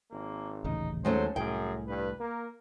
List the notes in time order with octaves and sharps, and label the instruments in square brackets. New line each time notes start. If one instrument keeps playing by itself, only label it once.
[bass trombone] G#1 [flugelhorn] A#3
[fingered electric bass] D#1 A1 C#3 [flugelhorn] D#4
[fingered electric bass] D#2 [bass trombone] F#3 [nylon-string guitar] G#3 A3 C#4 [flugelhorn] C5
[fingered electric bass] C2 A2 [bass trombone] F#2 [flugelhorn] G#4 [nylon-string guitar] G5
[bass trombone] G2 [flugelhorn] B4
[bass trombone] A#3 [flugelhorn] A#4